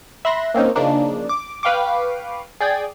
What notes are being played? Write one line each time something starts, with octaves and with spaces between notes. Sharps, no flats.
E5 B5 C6 F#6 A#6
A#3 C4 C#4 D#4
C#3 F3 A#3 D4 D#4
D6
B4 F5 G5 C#6 D6
G#4 D5 G5 D#6 G#6